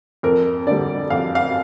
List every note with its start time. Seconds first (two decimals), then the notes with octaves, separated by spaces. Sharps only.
0.23 F2 A#4
0.67 D3 G3 D5
1.10 F2 F5
1.35 F5